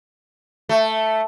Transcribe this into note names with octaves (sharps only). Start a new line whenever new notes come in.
A3